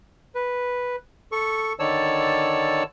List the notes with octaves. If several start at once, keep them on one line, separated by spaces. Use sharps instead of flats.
B4
A4 C#6
D3 D#3 C#5 D5 A5 E6